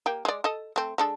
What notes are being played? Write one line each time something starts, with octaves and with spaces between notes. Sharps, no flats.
A#3 G4
G#3 D5
A4 D#5
A3 C4
G#3 D4 A4